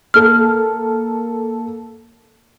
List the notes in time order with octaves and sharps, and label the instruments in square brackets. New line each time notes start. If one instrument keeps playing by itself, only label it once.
[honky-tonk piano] A#3 A4 [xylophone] F6